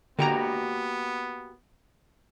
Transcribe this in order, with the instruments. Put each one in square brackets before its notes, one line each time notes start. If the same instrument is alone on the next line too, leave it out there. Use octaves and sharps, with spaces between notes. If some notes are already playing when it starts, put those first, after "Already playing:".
[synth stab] D3 A#5 [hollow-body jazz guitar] A#3 F#4 G4 [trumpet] B3